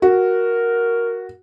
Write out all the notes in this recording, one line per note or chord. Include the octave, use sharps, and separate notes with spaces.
F#4 A#4